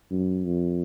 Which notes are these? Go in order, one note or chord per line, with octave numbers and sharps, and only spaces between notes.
F#2
F2